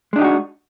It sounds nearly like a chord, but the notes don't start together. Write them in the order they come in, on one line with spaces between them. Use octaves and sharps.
G#3 D4 D#4 G4 F#4